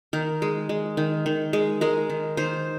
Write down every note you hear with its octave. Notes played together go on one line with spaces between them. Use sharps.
D#3 A#4
G#3
G#3
D#3
D#3
G#3
G#3 A#4
D#3
D#3 C5